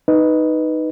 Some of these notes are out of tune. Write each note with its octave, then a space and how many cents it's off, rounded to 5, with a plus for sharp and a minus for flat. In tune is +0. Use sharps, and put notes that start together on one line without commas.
D#4 +0 B4 +0 D#5 +0